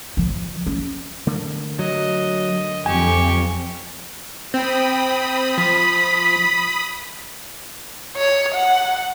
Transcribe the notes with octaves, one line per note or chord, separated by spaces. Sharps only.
D3 F3
C#4
D3 A3 A#3
F#3 D#5
F2 G4 G#5 C#6
C4 G5 B5 D#6
F3 B6
C#5
F#5